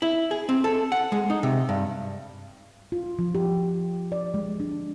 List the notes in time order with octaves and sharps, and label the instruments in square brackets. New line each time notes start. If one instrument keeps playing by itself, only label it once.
[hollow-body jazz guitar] E4
G#4
C4
A4
F#5
G#3
D#4
C3
G2
[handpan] F4
F3
G4
D5
G#3
D4